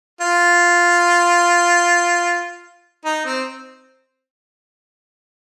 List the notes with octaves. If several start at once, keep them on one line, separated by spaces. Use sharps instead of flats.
F4
D#4
C4